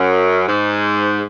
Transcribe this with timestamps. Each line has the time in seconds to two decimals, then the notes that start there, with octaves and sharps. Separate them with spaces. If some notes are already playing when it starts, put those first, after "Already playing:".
Already playing: F#2
0.48 G#2